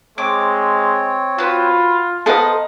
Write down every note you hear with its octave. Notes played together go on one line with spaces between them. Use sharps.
G#3 C4 C#5 D6
F4 F#4 B4
B3 A4 B4 C5 D#5 F5 A#5